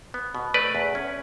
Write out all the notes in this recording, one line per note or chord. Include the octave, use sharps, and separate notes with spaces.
B3
B2
A3 B4 D5
E2
C#4